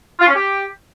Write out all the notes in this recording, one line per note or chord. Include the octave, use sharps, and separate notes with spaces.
F4
C#4
G4